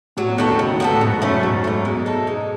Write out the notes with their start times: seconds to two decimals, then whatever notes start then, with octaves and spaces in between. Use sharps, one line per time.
0.17 A2 F#3
0.28 B2
0.38 D#3 B3 F#4 A4
0.49 D#3
0.59 C#3 F#3
0.70 B2
0.80 B2 B3 F#4 A4
0.90 A2
1.01 G#2 B2
1.22 F#2 A3 C#4
1.43 G#2 B2
1.64 A3 C#4
1.85 B2 G#3
2.06 D#4 A4
2.27 G#3